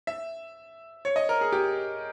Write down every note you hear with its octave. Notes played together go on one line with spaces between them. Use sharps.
E5
C#5
D#5
A#4
G#4
G4